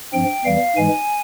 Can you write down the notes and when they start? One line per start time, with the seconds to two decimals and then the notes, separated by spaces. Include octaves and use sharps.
0.13 G2 F3 C4 G5
0.45 E2 E3 G3 F5
0.76 G#2 E3 G#3 G#5